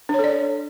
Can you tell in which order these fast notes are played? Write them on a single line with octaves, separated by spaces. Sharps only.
D4 C#5 A4 D5